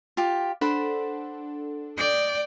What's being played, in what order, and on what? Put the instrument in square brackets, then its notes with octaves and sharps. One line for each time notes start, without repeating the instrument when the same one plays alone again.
[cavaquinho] F4 G4
[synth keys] D4 A4 [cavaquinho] C5 F#5 B5
[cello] D5 G5 [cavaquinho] D#5